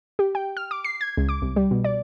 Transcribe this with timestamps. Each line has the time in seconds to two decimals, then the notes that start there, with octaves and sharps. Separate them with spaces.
0.19 G4
0.35 G5
0.57 F6
0.71 D6
0.84 C7
1.01 G#6
1.17 C#2
1.29 D6
1.42 C2
1.56 G3
1.71 B2
1.84 D5